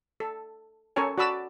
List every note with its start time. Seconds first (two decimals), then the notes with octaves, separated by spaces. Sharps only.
0.20 A4
0.96 C#4 A4 A#4 C#5 G#5
1.18 F#4 D5 A5 B5 E6